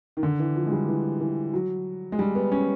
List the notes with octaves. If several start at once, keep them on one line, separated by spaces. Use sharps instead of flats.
D#3
D3
E3
F3
G#3
G3
E3
E3
F#3
G#3
G3
B3
C#4